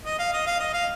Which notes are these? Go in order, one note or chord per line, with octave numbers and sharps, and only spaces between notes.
D#5
F5
D#5
F5
D#5
F5